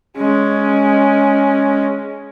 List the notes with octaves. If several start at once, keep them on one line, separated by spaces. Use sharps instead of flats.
G#3 C#4